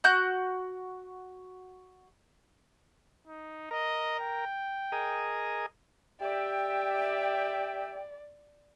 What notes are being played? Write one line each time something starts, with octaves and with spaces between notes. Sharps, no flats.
F#4 F#6 G6
D#4
A#4 D#5
G5
G#4 A#4 D#5
G4 D5 E5 G5